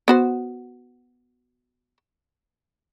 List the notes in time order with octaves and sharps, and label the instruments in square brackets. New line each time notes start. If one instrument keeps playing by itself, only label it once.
[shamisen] B3 F#4 C5